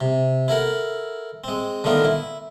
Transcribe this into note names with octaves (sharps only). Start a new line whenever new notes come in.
C3
E4 A4 A#4 F#5
G#3 C4
D3 D#3 A3 B3 F4 A#4
E4